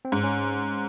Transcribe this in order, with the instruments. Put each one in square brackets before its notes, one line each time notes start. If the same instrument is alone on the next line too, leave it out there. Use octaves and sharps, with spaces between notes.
[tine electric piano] C4
[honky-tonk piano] G#2 [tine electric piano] C#4
[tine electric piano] C#4